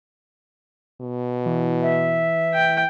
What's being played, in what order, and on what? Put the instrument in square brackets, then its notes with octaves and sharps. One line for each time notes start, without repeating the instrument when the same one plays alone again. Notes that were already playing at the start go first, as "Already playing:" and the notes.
[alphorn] B2
[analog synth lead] E3
[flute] E5
[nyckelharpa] G5